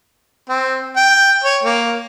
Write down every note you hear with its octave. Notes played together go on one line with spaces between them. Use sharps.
C4
G5
C#5
A#3